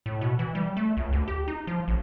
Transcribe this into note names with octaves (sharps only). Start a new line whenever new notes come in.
A2
B2
E3
G3
A3
C#2
D2
G4
D#4
F3
A1